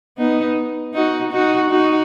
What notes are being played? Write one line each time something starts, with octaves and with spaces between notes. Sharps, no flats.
B3 D#4
D#4 F#4
D#4 F#4
D#4 F#4